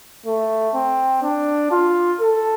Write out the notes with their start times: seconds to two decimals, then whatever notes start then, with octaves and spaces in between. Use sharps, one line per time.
0.26 A3
0.75 C4
1.23 D4
1.71 F4
2.21 A4